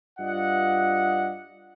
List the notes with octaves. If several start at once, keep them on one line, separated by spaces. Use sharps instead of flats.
G2 F4 D5 D#5 F#5